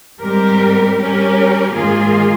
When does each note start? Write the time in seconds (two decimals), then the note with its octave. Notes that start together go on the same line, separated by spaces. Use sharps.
0.21 G#2 G3 C4 G4 A#4
0.97 G3 C#4 G4 A#4
1.73 G#2 D#3 A#3 F4 G#4